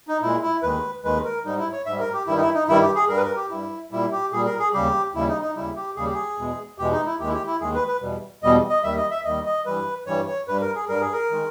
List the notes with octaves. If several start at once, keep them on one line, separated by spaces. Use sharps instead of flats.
D#4
A#2 G#3 E4
E4
D#2 D#3 G#3 B4
D#2 D#3 G#3 B4
A#4
G#2 G3 D#4
E4
C#5
G#2 G3 E5
A#4
G4
G2 D#3 G3 E4
D#4
E4
D#4
G2 D#3 G3 E4
G4
G#4
G2 G3 A#4
B4
A#4
G4
G2 G3 E4
A#2 G3 E4
G4
A#2 G3 G#4
A#4
G#4
D#2 C#3 G3 G4
D#2 C#3 G3 E4
D#4
D#4
D#2 C#3 G3 E4
G4
D#2 C#3 G3 G#4
G4
G#4
E2 B2 G#3
E2 B2 G#3 G4
D#4
E4
D#2 D#3 G#3 G4
E4
G4
E4
D#2 D#3 G#3 G#4
B4
B4
E2 B2 G3
E2 B2 G3 D#5
D#5
D#2 D#3 G3 E5
D#5
E5
D#2 D#3 G3 D#5
D#5
G2 E3 G3 B4
G2 E3 G3 C#5
C#5
G2 G3 B4
A#4
G#4
G2 G3 A#4
G#4
A#4
D#3 G#3